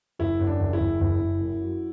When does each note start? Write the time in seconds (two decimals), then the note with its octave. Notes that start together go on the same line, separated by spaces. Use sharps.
0.19 F#1 E4
0.39 F#2
0.47 D4
0.60 F#1
0.73 E4
0.80 F#1
1.00 F#1
1.20 F#1
1.40 F#2
1.61 F#3